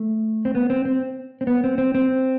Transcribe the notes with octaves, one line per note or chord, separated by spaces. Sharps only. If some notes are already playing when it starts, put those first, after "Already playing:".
Already playing: A3
C4
B3
C4
C4
C4
B3
C4
C4
C4